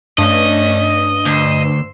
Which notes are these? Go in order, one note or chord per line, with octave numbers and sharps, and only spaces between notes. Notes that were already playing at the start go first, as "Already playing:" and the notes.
G2 A3 C#4 D4 D#5
D2 C6 E6